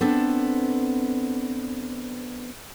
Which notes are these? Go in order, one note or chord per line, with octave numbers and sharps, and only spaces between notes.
B3 C4 D4 A4